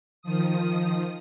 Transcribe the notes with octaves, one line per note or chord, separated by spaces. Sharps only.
D#3 F3 D#6